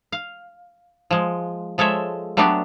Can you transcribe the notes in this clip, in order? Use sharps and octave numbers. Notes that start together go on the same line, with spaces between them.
F5
F3 G#3
F3 G#3 A4 C#5 E5
F#3 A3 B3 D4 F#4 G4